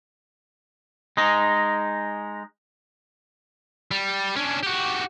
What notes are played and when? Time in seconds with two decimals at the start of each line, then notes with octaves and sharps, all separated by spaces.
1.17 G#3 D#4
3.91 G3
4.36 C#4 D4
4.63 F#4 G4